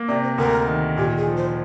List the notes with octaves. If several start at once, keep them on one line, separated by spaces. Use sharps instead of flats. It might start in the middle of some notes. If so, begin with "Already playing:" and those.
Already playing: A#3
C3 D5
C5
D2 A#4
D#3
A#2 G4
G#4
F3
C5